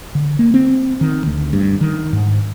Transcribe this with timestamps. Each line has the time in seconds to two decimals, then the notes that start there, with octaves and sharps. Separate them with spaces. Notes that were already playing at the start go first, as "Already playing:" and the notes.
0.15 D3
0.39 A#3
0.54 C4
1.01 D#3
1.26 D2
1.53 G2
1.81 D#3
2.13 G#2